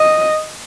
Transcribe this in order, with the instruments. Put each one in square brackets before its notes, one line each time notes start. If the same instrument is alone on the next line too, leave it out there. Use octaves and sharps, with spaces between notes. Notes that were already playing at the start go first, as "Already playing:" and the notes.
Already playing: [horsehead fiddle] D#5